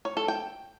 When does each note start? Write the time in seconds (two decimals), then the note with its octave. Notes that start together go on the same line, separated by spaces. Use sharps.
0.05 C#5
0.17 A4
0.28 G5